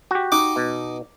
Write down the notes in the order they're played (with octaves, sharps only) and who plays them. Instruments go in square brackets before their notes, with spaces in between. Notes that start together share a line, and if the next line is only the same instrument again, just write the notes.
[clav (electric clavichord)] F#4 G4
[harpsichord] D#4 D6
[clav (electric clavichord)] B2